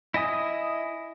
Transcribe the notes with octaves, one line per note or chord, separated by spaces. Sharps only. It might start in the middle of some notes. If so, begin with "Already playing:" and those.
E4 D#5 G#5 D#6